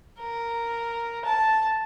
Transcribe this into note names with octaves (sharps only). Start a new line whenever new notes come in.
A#4
A5